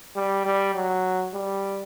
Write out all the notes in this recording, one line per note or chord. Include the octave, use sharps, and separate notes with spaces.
G3
G3
F#3
G3